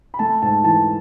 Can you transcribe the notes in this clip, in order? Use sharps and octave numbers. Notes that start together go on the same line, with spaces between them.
B5
A3 A5
G#2 A5
E3 A5